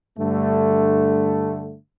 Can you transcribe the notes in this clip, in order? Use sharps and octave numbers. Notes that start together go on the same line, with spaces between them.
G2 D3 A3